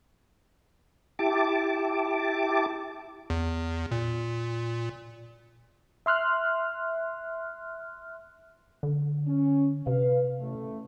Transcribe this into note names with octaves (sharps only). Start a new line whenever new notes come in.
E4 G4 A5 D6
E2
A#2
E5 C6 F6 F#6
D3
C#4
C3 B4 F5
A1 A3